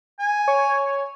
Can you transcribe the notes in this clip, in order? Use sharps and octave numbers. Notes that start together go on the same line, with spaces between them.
G#5
C#5